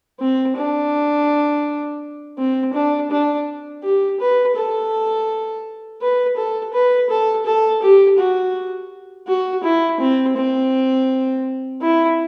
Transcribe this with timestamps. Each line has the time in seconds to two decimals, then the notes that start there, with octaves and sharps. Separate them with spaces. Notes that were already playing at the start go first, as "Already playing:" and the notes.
0.20 C4
0.57 D4
2.38 C4
2.74 D4
3.11 D4
3.83 G4
4.20 B4
4.55 A4
6.01 B4
6.37 A4
6.74 B4
7.10 A4
7.46 A4
7.82 G4
8.18 F#4
9.28 F#4
9.64 E4
10.00 C4
10.37 C4
11.81 E4